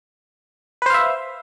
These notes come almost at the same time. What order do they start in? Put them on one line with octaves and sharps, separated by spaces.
B4 C5 F5 E5